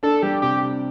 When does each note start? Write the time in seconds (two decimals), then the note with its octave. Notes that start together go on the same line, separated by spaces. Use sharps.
0.03 D4 A4
0.23 G3 G4
0.42 C3 G4